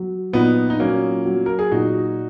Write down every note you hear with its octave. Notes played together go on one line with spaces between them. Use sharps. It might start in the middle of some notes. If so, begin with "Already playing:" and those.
Already playing: F#3
A#2 B3 D#4
D#4
F#3 A#3 C#4
F#3
A#4
G#4
A#2 D#4 F#4